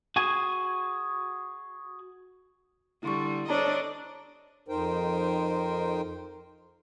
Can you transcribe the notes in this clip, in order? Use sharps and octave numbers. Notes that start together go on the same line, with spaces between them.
F#4 G#4 G#5
D3 G3 E4 C6 C#6
D4 A4 C5 C#5 D#5 A5 A#5
F2 D#4 A#4 C5 G5